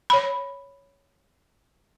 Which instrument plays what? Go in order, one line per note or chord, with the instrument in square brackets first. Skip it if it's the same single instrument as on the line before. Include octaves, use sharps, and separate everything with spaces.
[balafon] C#5 B5